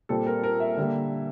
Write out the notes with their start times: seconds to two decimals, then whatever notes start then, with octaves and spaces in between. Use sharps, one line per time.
0.09 A#2 G3 C4 A4
0.27 A#4
0.44 A#4
0.60 E5
0.77 D3 G3 A#3